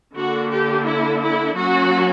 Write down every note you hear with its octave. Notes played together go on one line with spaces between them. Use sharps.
D3 A#3 D4 F#4
G4
E4
E4
F#3 A#3 C#4 F#4